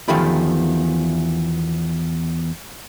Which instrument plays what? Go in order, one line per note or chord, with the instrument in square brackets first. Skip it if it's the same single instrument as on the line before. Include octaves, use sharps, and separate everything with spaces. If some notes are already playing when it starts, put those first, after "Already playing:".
[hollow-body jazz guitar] E2 D#3 F3 A3 G4 B5